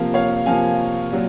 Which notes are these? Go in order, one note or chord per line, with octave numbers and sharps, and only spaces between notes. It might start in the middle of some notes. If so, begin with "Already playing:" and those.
Already playing: C3 F3 A#3 F5
C#5 F5
C3 F3 A#3 F5 G#5
A#2 F#3